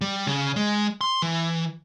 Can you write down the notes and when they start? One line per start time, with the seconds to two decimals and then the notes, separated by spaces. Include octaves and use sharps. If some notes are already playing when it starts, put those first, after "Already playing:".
0.01 G3
0.27 C#3
0.56 G#3
1.01 C6
1.22 E3